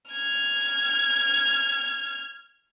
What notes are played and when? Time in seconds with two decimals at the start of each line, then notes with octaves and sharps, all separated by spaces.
0.12 F6 G#6